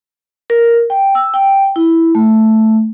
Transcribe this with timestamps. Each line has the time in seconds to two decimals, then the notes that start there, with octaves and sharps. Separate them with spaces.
0.50 A#4
0.90 G5
1.15 E6
1.34 G5
1.76 E4
2.15 A3